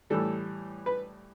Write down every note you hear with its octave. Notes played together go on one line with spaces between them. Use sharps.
A2 E3 G3 A4
B4